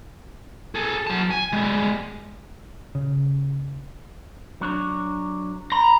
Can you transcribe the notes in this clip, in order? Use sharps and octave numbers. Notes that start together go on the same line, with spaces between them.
G#4 A4
F#3 A5
G#5
G3 G#3
C#3
F#3 D4 C#5
A#5 B5